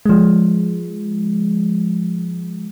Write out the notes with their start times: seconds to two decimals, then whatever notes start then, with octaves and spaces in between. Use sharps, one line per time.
0.06 F3 G#3